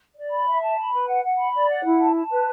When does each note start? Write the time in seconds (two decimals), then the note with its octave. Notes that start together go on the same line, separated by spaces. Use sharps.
0.14 D5
0.31 B5
0.46 E5
0.61 A5
0.77 B5
0.92 B4
1.08 F#5
1.23 F#5
1.38 B5
1.54 D5
1.69 F#5
1.84 E4
2.00 A5
2.15 A5
2.30 B4